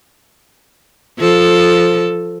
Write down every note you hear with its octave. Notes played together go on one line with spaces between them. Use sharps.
F3 A4